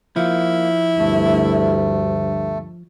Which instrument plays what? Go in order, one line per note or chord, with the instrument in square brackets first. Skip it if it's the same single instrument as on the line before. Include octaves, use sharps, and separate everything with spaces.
[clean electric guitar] F3 [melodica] A#3 [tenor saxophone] E4
[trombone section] D2 G2 [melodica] A3